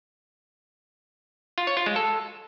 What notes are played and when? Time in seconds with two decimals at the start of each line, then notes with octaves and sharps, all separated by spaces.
1.58 F4
1.67 C#5
1.77 F4
1.86 G#3
1.96 A4